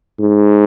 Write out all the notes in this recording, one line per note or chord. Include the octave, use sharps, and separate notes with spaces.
G#2